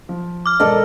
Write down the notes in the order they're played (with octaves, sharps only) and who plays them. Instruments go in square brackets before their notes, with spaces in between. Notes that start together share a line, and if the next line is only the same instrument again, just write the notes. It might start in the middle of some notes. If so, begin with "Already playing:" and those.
[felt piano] F3
[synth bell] D6 F6
[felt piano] E1 D5 [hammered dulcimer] A4 A#4 D#5